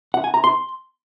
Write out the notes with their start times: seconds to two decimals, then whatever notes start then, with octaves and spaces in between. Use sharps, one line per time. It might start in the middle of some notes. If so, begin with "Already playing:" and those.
0.14 F#5
0.24 G#5
0.34 A#5
0.44 C6